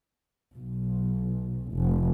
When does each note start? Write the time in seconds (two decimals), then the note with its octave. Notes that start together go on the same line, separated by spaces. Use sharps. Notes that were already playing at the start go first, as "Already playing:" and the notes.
0.55 B1
1.73 F1